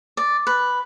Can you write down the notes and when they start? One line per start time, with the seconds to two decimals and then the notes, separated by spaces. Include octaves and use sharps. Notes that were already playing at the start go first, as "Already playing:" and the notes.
0.17 D5
0.47 B4